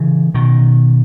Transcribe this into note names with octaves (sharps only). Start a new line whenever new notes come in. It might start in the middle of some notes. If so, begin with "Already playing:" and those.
Already playing: C#3 E3
B2 D#3